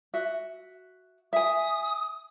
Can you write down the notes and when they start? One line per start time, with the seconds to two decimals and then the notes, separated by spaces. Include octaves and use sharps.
0.14 F#4 E5
1.33 E5 G#5 D#6